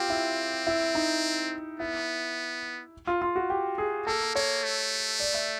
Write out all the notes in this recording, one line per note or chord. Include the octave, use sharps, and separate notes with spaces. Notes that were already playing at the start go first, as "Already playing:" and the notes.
Already playing: C4 F4 G4
E4
E4
D#4
B3 E4
F4
F4
F#4
G4
G#4
A#3 A4
A#3 C#5
A3
D5
E5